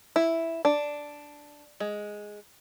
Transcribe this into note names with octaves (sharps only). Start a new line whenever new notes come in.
E4
D4
G#3